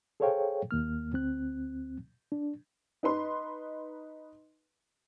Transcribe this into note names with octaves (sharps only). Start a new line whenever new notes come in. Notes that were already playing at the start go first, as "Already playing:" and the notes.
G#4 A4 C5 C#5 F5 G5
D#2 A#3 F6
D2 C4 F#6
D4
D#4 B4 C6